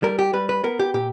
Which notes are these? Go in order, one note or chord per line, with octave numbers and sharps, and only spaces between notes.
G3 A#4
G4
G3 B4
B4
B3 A#4
G4
A#2 G4